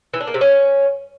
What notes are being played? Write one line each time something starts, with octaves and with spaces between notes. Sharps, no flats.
E3
D4
A#3
C3
C#4